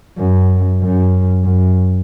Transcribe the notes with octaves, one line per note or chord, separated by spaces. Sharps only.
F#2
F#2
F#2